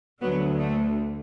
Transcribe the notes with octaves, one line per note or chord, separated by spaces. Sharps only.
D2 D3 F#3 B3
A3